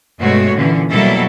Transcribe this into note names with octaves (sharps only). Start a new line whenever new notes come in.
G2 B2 G#3 A3 F#4 C#5
A#2 D3 E3 C#4
B2 F#3 G3 A#3 E4 A4